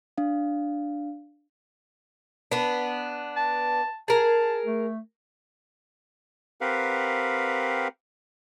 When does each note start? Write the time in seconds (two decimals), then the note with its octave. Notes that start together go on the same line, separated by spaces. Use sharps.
0.18 D4 F5
2.51 B3 D4
3.36 A5
4.08 G#4 A#4 A5
4.66 A3
6.61 C4 G4 A#4 B4 F5 F#5